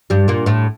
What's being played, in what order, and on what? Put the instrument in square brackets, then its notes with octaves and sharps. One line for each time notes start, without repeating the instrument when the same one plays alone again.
[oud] G2 G3
A#2 A#3
A2 A3